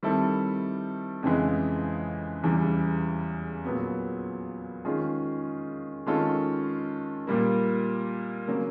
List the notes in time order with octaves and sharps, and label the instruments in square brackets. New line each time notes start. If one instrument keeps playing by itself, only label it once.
[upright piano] D#3 G3 C4 E4 A4
F2 C#3 E3 G#3
E2 C#3 E3 G3
A#2 F#3 B3
D#3 G#3 C#4 F4 G#4
D#3 G#3 C#4 F4 A4
A#2 G3 A#3
C#3 F#3 A#3